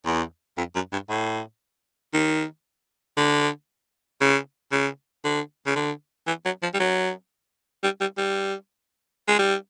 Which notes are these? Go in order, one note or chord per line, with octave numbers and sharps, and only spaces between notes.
E2
F2
F#2
G2
A2
D#3
D3
C#3
C#3
D3
C#3
D3
E3
F#3
F3
G3
F#3
G3
G3
G3
G#3
G3